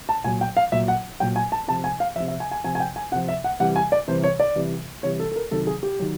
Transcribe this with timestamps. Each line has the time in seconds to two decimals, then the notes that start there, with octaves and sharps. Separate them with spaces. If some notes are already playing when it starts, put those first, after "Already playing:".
0.09 A5
0.24 A#2 F#3 G#5
0.41 G5
0.57 F5
0.72 A#2 F#3 E5
0.88 F#5
1.20 A#2 F#3 G5
1.36 G#5
1.52 A5
1.68 C3 F3 A5
1.84 G#5
2.00 F5
2.16 F3 E5
2.20 C3
2.28 E5
2.40 G#5
2.51 G#5
2.64 C3 F3 G#5
2.75 G#5
2.80 G5
2.96 G#5
3.12 C3 F#5
3.16 F3
3.29 E5
3.44 F#5
3.60 C3 E3 G3 F#5
3.76 G#5
3.92 D5
4.08 C3 E3 G3 C5
4.24 C#5
4.40 D5
4.55 C3 E3 G3
5.03 C3 E3 G3 C#5
5.20 A4
5.32 A4
5.36 A#4
5.51 C3 D#3 F#3 A4
5.67 G#4
5.83 G4
5.99 D#3 F#3